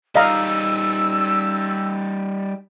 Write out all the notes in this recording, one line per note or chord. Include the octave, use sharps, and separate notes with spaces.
G3 D#4 D#5 F5 A#5 E6